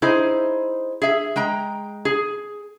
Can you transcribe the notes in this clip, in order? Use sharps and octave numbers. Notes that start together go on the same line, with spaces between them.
D#4 E4 G#4 C5
G#4 E5
G#3 G5 A#5
G#4